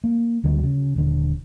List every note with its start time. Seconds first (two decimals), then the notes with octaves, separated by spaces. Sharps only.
0.04 A#3
0.44 D2 D3 F#3 G3
0.63 C#3
0.96 D#1 D3